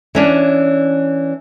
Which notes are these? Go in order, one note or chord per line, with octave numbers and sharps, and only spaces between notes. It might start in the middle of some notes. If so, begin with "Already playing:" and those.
E3 C#4 D4